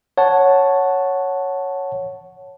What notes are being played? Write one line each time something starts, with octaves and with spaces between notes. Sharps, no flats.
C#5 F#5 A5